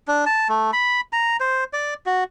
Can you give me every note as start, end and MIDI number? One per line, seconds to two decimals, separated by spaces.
0.08 0.25 62
0.26 0.48 81
0.49 0.71 57
0.73 1.01 83
1.13 1.37 82
1.40 1.64 72
1.73 1.94 74
2.06 2.24 66